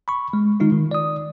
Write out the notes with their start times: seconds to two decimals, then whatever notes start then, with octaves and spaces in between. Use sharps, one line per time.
0.08 B5 C#6
0.33 G#3
0.60 D#3 G#3 D#4 F4
0.72 D#3
0.91 D5 D#6